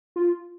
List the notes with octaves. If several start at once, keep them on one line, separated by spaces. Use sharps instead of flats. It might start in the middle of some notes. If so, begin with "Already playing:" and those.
F4